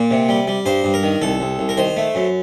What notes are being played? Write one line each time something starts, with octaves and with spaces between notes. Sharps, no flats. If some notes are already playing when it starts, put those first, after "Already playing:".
Already playing: A#2 D5
C3
G3
G3
G2 C5
G2
A#4
D#3
C2 A4
C2
C2
A#4
D#3 C5
A3
F#2